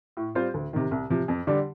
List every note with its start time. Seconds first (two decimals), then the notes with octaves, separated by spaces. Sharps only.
0.17 A2
0.35 G3 C4 F4 C5
0.54 D2
0.73 C3 D#3
0.91 C2
1.10 C3 F3
1.28 F2
1.47 D3 G3 D4 G4